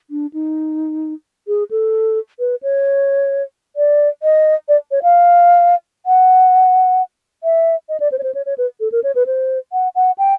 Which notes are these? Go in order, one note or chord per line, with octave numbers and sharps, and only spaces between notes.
D4
D#4
G#4
A4
B4
C#5
D5
D#5
D5
C#5
F5
F#5
E5
D#5
D5
C5
C#5
C5
C#5
C#5
B4
A4
A#4
C#5
B4
C5
F#5
F#5
G5